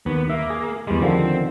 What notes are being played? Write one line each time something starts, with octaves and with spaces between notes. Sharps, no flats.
D#2 B3
A#3 E5
G#4
E2 G3 G#3
D3 D#3 F3 C4